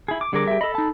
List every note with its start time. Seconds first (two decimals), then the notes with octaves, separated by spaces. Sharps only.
0.08 E4 G#4
0.21 D6
0.33 D3 G3 G#4 A#4 D6
0.47 G4 E5
0.61 A4 D#5 B5
0.75 D#4 A5